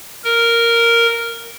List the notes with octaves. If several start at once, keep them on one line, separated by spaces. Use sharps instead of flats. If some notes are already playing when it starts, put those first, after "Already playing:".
A#4